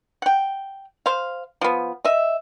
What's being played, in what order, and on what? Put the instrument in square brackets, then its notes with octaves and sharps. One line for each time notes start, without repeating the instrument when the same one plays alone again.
[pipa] F#5 G5
C5 F5
F3 B3
D#5 E5